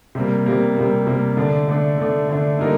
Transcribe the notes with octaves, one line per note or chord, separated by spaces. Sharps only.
C3 G3 A#3
C3 G3 A#3
C3 G3 A#3
C3 G3 A#3
D3 A3 D4
D3 A3 D4
D3 A3 D4
D3 A3 D4
D3 G3 A#3 D#4 A#4